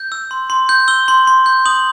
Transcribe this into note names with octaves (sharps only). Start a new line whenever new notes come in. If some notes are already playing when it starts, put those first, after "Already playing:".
Already playing: G6
E6
C6
C6
G6
E6 G7
C6
C6
G6
D#6 F#7